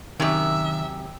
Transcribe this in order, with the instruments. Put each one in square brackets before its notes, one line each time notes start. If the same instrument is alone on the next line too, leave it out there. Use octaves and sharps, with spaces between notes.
[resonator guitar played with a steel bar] F#2 C3 [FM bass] D#3 [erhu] E5